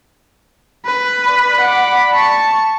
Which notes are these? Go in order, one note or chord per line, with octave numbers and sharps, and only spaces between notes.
B4
D5 B5
F#5 D6
A5 C#6